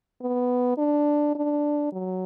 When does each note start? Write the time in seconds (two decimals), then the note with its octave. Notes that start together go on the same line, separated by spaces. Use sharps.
0.21 B3
0.78 D4
1.35 D4
1.92 F#3